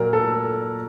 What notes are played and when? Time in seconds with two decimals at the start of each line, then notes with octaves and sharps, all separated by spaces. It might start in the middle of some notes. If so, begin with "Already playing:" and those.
Already playing: A#2 F#3 A#3 A#4
0.13 A4